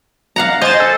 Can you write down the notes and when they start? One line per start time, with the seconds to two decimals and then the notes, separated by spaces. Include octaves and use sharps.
0.36 F5 F#5 A#5
0.61 C5 D#5 G#5 A6
0.80 A4